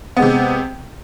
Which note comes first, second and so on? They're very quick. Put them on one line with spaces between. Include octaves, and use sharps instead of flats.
B3 G#3 C3